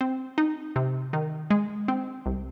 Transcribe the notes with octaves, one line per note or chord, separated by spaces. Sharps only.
C4
D#4
C3
D#3
G#3
C4
C2